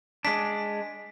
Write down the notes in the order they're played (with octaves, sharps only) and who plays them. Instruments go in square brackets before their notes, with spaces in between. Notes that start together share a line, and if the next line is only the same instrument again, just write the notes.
[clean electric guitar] G#3 D4 [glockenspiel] B6